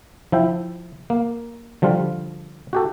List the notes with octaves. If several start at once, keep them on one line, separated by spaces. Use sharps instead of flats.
F3 E4 G5
A#3
D3 F3 G3 F4
F#4 G4 A4